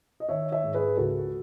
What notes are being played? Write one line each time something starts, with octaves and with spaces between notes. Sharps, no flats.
D#5
D#3 C#5 E5
C#5 E5
G#2
G#4 B4
C#2 F#4 A4